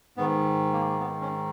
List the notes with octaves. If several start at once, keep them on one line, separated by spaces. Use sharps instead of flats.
G#2 D#3 B3
A#3
B3
C#4